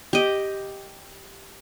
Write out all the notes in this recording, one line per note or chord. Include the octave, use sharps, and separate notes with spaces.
G4 D#5